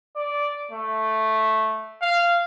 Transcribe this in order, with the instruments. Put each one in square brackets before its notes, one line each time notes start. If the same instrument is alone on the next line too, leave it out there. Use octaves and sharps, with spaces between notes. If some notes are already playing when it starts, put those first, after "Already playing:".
[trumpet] D5
A3
F5